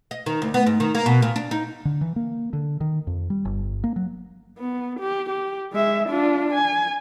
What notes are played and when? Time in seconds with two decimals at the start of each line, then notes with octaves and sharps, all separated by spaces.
0.11 D#5
0.26 D#3
0.42 D2
0.54 B3
0.66 G#2
0.80 D#3
0.95 A#3
1.06 B2
1.22 A#2
1.36 D4
1.51 D#4
1.85 D3
2.01 E3
2.16 A#3
2.53 D3
2.81 D#3
3.07 F2
3.30 G3
3.45 G1
3.84 A#3
3.96 F#3
4.58 B3
5.00 G4
5.29 G4
5.73 G#3 E5
6.09 D4 F4
6.54 G#5